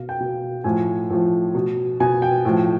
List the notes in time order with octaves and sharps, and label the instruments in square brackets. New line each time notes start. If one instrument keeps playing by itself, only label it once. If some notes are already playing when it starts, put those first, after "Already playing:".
Already playing: [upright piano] B2 F5
G5
B2
A2 F3 G#5
A2 F3
B2
B2 G#5
G5
A2 F3